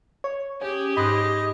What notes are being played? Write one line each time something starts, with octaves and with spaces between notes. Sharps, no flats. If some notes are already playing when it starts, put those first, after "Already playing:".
C#5
C#4 G4 G#4 C#5
G#2 D#5 B5 C6 F#6